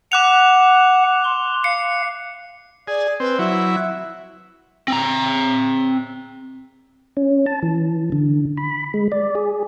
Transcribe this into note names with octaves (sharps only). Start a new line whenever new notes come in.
F#5 D6 F#6 F7
C6
F5 C#7
G#4 D5
C4 B4
F#3 E4 E5
C4 A#5
C#4
A5
E3
D3
B5
G#3
D5
G#4